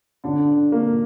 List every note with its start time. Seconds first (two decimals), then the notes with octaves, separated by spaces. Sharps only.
0.24 D3 D4
0.48 D3
0.72 A#3